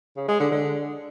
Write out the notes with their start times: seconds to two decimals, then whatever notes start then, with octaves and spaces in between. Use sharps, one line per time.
0.17 C#3
0.28 G#3
0.40 D3
0.51 D3